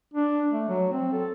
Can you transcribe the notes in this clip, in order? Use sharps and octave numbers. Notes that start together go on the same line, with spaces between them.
D4
A3
F#3
C4
A4